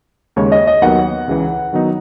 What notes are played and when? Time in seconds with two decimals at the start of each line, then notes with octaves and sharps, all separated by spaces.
0.36 D#2 C#3 G#3 C#5
0.52 D#5
0.67 D#5
0.82 D#2 D#3 F#3 B3 F#5
1.28 C#2 C#3 E3
1.73 D#3 F#3 B3 D#4